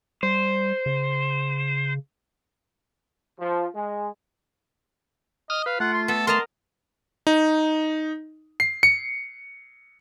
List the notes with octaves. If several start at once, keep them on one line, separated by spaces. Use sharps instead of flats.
G3 C5
C#3
F3
G#3
D#5 D#6 F6
B4 F5
A3 F4 F#5
C6
B3 A4
A#4 D#5 A5 A#5 C6
D#4
C7
C#7